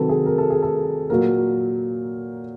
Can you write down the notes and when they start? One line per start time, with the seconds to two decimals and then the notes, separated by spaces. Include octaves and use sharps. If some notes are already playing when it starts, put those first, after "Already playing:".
Already playing: C3 D#3 F#3 A4 B4
0.09 G#4
0.26 A#4
0.38 A4
0.50 G#4
0.63 A4
1.10 A#2 F#3 A#3 A#4